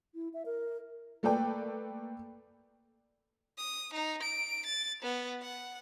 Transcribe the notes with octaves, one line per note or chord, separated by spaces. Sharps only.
E4
E5
A#4
A3 A#3 A4 B4 D5 G5
D#6
D#4
D7
A6
B3
F#5